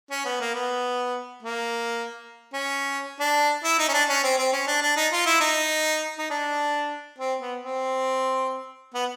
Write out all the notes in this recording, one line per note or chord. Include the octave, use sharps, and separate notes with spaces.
C#4
B3
A#3
B3
A#3
C#4
D4
E4
D#4
C#4
D4
C#4
C4
C4
C#4
D4
D4
D#4
F4
E4
D#4
D#4
D4
C4
B3
C4
B3